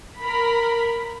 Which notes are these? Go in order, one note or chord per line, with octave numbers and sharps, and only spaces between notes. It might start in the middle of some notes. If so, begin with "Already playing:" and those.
A#4 B5